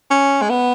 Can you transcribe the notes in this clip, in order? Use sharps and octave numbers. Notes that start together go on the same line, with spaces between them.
C#4
G#3
B3